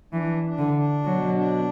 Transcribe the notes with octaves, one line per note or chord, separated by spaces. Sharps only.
E3 D4
D4
D3
D4
B2 F#3
D4